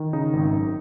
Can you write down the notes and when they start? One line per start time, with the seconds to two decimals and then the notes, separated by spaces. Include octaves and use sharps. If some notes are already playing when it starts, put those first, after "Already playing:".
Already playing: D#3
0.13 C#3 D#4
0.33 G#1
0.53 F#2